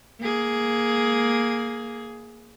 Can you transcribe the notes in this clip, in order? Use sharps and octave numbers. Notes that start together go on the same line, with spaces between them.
A#3 G#4